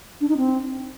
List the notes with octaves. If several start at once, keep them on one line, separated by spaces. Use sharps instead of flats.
D4
D#4
C4